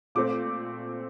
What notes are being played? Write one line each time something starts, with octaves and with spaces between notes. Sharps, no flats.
A#2 A3 C4 D6